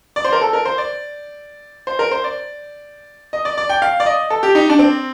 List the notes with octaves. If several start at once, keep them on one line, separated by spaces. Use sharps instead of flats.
D5
C5
A#4
A4
A#4
C5
D5
C5
A#4
C5
D5
D#5
D5
D5
G5
F5
D5
D#5
A4
G4
D#4
D4
C4